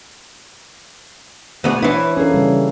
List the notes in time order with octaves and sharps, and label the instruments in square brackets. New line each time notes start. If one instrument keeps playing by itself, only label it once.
[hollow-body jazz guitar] D2 B3 G#4 [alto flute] C5
[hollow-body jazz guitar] E3 E4 [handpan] D4 [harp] B4 C#5
[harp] A#3 G#4 [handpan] C#4 D4 [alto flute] A4
[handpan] C#3 G3